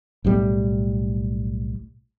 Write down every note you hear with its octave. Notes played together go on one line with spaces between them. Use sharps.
B1 A2 G3 B3